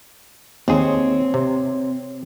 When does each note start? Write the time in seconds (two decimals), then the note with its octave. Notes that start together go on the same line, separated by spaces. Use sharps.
0.68 D#2 C4 G#4 C#5
1.34 C3